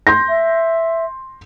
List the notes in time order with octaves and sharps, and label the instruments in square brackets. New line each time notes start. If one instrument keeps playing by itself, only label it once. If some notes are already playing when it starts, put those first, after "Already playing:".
[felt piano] C6 G6 A#6
[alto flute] E5